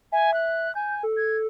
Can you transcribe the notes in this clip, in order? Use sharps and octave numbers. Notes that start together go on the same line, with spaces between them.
E5 G#5
F#6
G#5 G6
A4
G#6